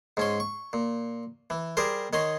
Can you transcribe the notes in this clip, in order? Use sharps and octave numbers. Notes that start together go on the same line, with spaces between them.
G#2 C#4 C6
C#6
A#2
E3
G3 G4 G#4 A#4 C5
D#3 C#5 D#5 C6